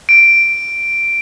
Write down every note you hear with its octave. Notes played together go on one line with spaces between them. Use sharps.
D7